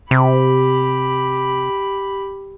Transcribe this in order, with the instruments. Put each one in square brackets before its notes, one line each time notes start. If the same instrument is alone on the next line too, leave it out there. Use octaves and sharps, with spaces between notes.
[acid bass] C3 [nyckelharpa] G4 B5